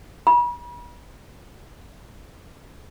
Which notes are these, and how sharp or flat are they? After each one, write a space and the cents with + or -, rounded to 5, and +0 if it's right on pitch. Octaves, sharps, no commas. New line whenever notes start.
B5 -40